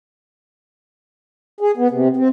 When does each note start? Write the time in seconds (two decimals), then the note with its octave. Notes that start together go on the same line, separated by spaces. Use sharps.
1.60 G#4
1.77 B3
1.91 C3
2.17 C4